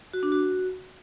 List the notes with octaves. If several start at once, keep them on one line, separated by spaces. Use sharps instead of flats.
F#4
D4
F#4